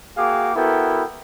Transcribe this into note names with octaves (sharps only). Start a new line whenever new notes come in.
A#3 F#4 G#4 F5 G5 D6
B3 E4 F#4 A4 A#4 G5